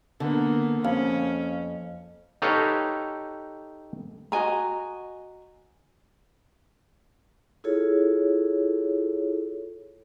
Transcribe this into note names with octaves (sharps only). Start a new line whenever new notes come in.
D3 A#3 B3
F2 C#4 F5
D#4 G4 A4 B4 C#5 F5
F#4 D#5 G#5 A#5
E4 F4 G#4 A4 C#5